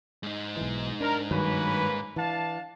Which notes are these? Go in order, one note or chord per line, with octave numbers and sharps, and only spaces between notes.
G#2 D#4
B1 E3
D4 A#4
G2 D#3 F#3 A#3 C#4 B4
E3 D4 F5 A5